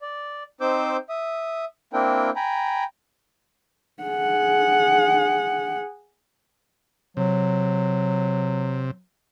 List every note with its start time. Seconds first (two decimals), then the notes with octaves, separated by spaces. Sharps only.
0.02 D5
0.61 C4 D#4 C5 D6 E6 G6
1.09 E5 D#6
1.93 A#3 C4 D4 E4 A#4 G5
2.36 G5 G#5 A#5 B5
4.03 G#4 F#5
7.17 C3 F#3